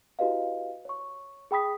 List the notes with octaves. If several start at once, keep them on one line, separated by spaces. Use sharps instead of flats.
E4 F#4 G4 B4 D#5 F5
C#5 C#6
G#4 G5 B5 D#6 B6